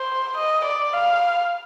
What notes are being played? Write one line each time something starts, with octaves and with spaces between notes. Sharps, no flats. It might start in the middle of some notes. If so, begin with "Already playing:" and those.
Already playing: C5
D#5
D5
F5